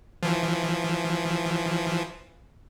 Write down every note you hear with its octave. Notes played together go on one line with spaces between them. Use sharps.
E3 F3